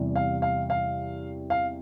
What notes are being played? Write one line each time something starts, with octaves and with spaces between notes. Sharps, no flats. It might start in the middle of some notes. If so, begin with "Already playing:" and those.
Already playing: E2 C3 G3
F5
F5
F5
F5